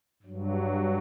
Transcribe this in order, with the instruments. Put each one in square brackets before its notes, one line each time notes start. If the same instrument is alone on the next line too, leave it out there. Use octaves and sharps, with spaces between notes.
[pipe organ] G2 F#3